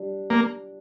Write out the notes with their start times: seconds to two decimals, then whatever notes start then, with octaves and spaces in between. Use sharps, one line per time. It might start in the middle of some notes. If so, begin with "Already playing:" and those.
Already playing: G3 D4
0.30 A#3